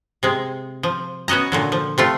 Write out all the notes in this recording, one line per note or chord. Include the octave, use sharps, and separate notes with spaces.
C3 G#3
F3
B3 C#4 F#4 D#5 A#5
A#2 D3 F#3
F3
C3 A3 F4